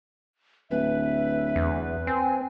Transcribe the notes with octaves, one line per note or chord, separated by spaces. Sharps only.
D1 B4 E5
E2
C4 G#5